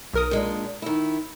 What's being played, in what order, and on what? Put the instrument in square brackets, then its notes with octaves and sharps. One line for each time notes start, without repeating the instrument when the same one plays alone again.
[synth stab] B1 A#4 D#6
[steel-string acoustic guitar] A#2 G#3 D4
D#3 E4